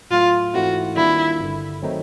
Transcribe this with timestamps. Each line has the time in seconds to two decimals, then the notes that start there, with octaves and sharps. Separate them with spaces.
0.10 A2 F#3 A3 F4
0.54 G#2 E3 A3 C4 E4 F#4
0.96 D#3 G3 A#3 D4 E4 F4
1.40 G1 G2 D3
1.82 D#3 F#3 A3 C4 D#4